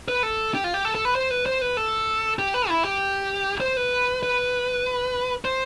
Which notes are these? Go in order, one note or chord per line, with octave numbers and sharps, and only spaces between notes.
B4
A4
G4
F4
G4
A4
A4
B4
C5
B4
C5
B4
A4
G4
B4
E4
G4
C5
B4
B4
C5